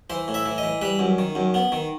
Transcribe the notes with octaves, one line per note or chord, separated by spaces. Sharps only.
E3 C5
A2
E5
E3
D#5
E3
G3 B4
F#2
D#3
F#2
B3
D#3